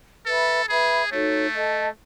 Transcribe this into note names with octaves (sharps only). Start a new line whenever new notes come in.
A4 B4 E5 B5
G#4 B4 E5 B5
A3 D#4 F#4 A4 C#5
A4 D#5 A5